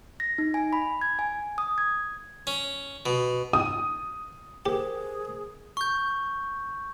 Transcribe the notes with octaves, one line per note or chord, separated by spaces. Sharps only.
A#6
D#4
G#5
B5
G#6
G#5
D#6
G#6
C#4
B2
D#6
G4 G#4 A#4 C5
C#6 G6